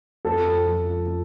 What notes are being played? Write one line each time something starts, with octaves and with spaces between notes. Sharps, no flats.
F2 A4
F3
F3